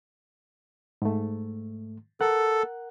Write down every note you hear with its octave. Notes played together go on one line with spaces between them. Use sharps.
G#2 A3
A4 A#4 F#5 F#6